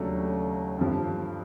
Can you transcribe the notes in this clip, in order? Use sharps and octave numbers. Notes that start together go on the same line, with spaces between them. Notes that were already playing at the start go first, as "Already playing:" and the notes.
Already playing: D#2 C#3 F#3 A3 D4
G2 D3 F3